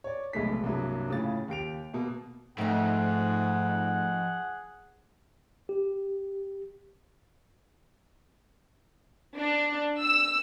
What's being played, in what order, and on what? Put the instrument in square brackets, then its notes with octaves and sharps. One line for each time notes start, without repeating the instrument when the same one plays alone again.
[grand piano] C#5 D5
F1 B1 G#3 A3 B6
C2 G2 F#3 A#3
A2 C#3 C#4 F4 A6
D#2 G4 D7 F7
B2 A#3
[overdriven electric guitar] F2 [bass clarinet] G#2 [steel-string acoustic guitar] A3 D#4 [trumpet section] G#4 F#5
[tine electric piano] G4
[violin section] D4
E6